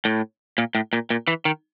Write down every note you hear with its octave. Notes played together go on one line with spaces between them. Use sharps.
A2
A#2
A2
A#2
A#2
E3
D#3